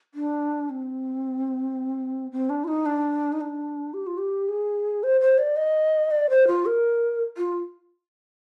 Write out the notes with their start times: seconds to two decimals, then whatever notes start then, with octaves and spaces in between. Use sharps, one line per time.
0.14 D4
0.70 C4
2.32 C4
2.50 D4
2.64 F4
2.68 D#4
2.86 D4
3.32 D#4
3.41 D4
3.94 G4
4.07 F4
4.18 G4
4.48 G#4
5.03 C5
5.21 C5
5.38 D5
5.56 D#5
6.11 D5
6.30 C5
6.47 F4
6.66 A#4
7.37 F4